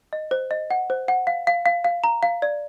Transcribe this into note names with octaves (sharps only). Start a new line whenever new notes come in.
D#5
C5
D#5
F#5
C5
F#5
F5
F5
F5
F5
A#5
F5
D5